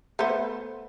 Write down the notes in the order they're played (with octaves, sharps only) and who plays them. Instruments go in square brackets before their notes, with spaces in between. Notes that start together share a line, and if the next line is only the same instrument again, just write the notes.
[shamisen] A3 B3 C5